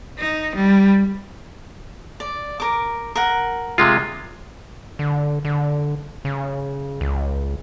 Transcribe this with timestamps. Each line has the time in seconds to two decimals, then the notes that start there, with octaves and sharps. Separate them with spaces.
0.19 D#4
0.55 G3
2.20 D5
2.60 A#4 D6
3.16 A#4 F#5
3.78 C3 G#3 F4
4.99 D3
5.45 D3
6.25 C#3
7.01 C#2